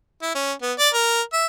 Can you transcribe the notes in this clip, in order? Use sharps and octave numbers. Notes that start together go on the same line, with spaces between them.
E4
C#4
B3
D5
A#4
E5